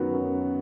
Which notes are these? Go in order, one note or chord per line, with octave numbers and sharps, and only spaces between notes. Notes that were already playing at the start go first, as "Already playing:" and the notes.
Already playing: F#2 D#3 F#3 B3 F#4
F#2